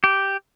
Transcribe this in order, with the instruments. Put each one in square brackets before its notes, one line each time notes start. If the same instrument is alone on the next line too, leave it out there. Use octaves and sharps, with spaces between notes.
[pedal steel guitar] G4